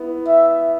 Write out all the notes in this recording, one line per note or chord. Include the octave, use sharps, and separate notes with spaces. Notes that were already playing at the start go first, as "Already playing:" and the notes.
Already playing: B3 E4
E5